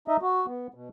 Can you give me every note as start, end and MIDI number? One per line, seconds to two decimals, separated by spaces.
0.08 0.17 63
0.08 0.17 75
0.08 0.17 76
0.22 0.46 66
0.47 0.67 59
0.74 0.89 47